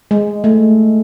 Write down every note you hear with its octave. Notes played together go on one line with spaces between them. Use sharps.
G#3
A3